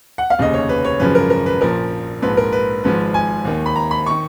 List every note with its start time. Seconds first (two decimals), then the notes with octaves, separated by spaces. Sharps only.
0.18 F#5
0.30 F5
0.39 F1 D#2 C#3 D#5
0.54 C#5
0.69 B4
0.85 C#5
0.99 G#1 F#2 C#3 F3 B4
1.15 A#4
1.30 A#4
1.46 B4
1.61 A#1 A#2 F3 A#4
2.22 A#1 G#2 F3 B4
2.37 A#4
2.52 B4
2.84 G#1 G#2 F3 B4
3.14 G#5
3.45 D#2 D#3
3.66 B5
3.76 A#5
3.91 B5
4.06 D#3 C#6